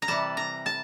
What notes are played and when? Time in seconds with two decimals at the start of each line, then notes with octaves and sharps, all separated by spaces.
0.02 A#5
0.08 C3 E3 G3 A5
0.37 A#5
0.66 A5